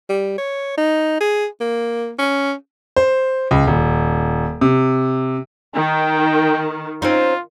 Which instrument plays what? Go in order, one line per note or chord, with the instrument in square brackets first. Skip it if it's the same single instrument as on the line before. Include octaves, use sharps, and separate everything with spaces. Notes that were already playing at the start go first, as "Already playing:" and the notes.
[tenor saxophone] G3
C#5
D#4
G#4
A#3
C#4
[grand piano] C5
C#2
D#1
C3
[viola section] D#3 [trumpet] G5
[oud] C4 C#4 D#4 [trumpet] F4